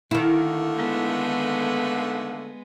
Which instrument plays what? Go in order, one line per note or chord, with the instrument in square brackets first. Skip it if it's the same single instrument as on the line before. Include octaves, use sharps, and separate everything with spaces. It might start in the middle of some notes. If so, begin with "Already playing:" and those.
[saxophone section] D3 A3 A#3 [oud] D#3 E4
[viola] G#3 B3